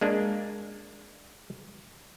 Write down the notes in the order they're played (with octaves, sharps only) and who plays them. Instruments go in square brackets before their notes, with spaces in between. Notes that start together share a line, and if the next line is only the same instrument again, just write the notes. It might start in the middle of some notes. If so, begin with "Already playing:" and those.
[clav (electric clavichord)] G#3 A#3 D4